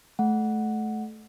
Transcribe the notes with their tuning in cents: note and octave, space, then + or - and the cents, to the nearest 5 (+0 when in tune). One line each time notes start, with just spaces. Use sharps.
A3 -25 F#5 +0